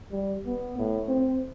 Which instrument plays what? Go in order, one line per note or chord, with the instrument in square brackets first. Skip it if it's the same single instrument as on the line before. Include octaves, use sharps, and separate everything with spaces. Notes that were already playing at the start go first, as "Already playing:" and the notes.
[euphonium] G3
B3
A2
C4